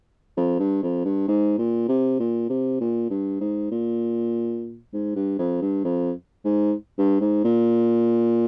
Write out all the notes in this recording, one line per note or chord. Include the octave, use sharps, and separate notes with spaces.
F2
G2
F2
G2
G#2
A#2
C3
A#2
C3
A#2
G2
G#2
A#2
G#2
G2
F2
G2
F2
G#2
G2
G#2
A#2